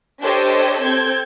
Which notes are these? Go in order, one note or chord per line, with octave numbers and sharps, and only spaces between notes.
D4 G4 A4 C5 C#5 D#5
C4 A4 G6 G#6